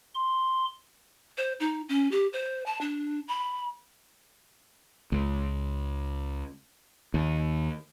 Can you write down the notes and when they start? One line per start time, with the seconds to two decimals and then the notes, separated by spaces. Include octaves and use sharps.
0.14 C6
1.38 C5
1.60 D#4
1.89 C#4
2.12 G4
2.33 C5
2.66 A5
2.81 D4
3.28 B5
5.12 C#2
7.14 D#2